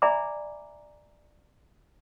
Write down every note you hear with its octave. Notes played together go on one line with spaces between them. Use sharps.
D5 E5 G#5 A#5 B5 D6